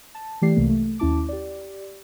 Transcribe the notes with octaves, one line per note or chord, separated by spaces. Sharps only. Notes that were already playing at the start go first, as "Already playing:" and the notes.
A5
E3 A3 G4 D5 C7
C2 C3 A3 A#3
A3
D#2 C#4 E4 A5 D6
G4 D5